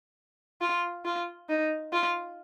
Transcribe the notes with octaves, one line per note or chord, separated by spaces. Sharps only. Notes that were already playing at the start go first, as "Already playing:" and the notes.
F4
F4
D#4
F4